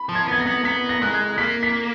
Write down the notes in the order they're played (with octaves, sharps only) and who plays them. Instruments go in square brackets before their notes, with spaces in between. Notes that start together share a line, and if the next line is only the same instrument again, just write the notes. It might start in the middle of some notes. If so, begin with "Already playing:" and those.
Already playing: [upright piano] B5
[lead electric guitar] F3
[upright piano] G#6
[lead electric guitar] B3 [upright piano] G#6
[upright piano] A#6
[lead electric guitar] B3
[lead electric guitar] B3 [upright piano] B6
[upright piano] A#6
[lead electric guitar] G#3 [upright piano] F#6
[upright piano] G#6
[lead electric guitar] A#3 [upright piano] B6
[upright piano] B6